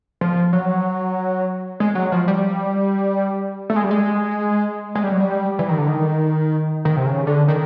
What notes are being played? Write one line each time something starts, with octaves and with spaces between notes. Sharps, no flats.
F3
F#3
G#3
F#3
F3
G3
A3
G#3
G3
G#3
G#3
G3
F#3
G3
E3
D#3
D3
D#3
D#3
C3
C#3
D3
D#3